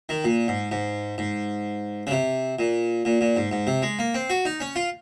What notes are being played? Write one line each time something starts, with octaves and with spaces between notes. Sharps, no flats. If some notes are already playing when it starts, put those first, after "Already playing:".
D#3
A#2
G#2
G#2
G#2
C#3
C3
A#2
A#2
A#2
G#2
G#2
C3
G#3
A#3
C4
F#4
D#4
C#4
F4